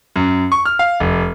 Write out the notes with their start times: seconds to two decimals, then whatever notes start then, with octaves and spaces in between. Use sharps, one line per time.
0.16 F#2
0.52 C#6
0.66 F6
0.79 F5
1.00 F1